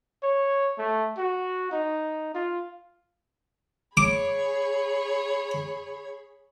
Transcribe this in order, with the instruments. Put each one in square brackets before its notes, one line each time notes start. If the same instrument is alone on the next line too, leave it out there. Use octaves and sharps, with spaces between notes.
[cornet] C#5
A3
F#4
D#4
F4
[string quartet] G#4 C#5 B5 [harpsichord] D6